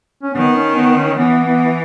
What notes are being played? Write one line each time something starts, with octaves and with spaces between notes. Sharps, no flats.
C#4
D#3 B3
C#4
B3
C#4
E3 B3
B3